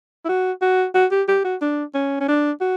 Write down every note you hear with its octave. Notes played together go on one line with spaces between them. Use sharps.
E4
F#4
F#4
F#4
G4
G4
F#4
D4
C#4
C#4
D4
F#4